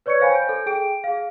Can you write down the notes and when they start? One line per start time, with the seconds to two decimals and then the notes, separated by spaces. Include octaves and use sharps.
0.06 B4 C#5 D5 C#6 G#6 C#7
0.20 C5 C#5 F5 G5 G#5 B5
0.34 G6 D7
0.49 A4
0.66 G#4 G5 D7
1.04 G#4 F5